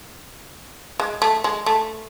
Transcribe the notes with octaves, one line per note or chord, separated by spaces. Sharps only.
G#3
A3
G#3
A3